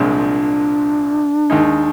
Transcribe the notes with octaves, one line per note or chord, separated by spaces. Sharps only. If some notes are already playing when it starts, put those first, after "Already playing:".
Already playing: C2 A#2 F3 G#3 C4 D4
D#2 D#3 G#3 D#4